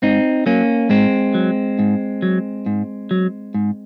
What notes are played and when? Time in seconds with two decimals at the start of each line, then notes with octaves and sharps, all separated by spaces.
0.02 G#2 C4 D#4
0.46 F#3 A#3 C#4
0.89 G#2 G#3 C4
1.34 F#3
1.79 G#2
2.22 F#3
2.66 G#2
3.11 F#3
3.54 G#2